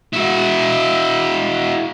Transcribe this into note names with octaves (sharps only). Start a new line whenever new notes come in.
E4 F#4